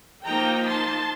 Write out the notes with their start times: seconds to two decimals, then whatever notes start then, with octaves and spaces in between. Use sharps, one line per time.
0.24 F3 A#3 D#4 G5 A#5
0.65 A5 C6